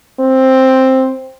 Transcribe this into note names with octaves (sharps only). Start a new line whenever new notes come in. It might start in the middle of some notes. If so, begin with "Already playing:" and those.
C4